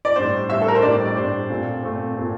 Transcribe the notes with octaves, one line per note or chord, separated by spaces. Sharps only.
D5
A2 G3 D4 C5
A2 G3 D4 E5
A4
A#4
C5
A2 G3 D4 D5
D5
A2 G3 D4 C5
A#2 A3 C4
A#2 A3 C4
A#2 A3 C4